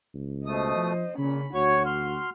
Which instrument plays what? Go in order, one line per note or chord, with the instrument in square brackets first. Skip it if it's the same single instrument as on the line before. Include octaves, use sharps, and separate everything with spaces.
[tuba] C#2
[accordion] B2 A3 D#6 [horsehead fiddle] C5 D#5
[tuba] F3
[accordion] A#2 [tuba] C#3 [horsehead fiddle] C#4 B5
[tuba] D2 [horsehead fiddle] F#4 [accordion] C#5 C#6
[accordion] C6 F6